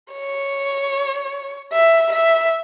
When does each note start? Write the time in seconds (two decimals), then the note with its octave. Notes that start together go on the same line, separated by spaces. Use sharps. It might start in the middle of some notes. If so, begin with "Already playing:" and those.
0.12 C#5
1.73 E5
2.12 E5